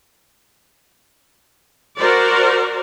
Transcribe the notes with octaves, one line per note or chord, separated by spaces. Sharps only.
F#4 A#4 C5 D5